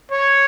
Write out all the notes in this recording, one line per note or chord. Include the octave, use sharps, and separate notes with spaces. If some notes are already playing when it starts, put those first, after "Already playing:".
C#5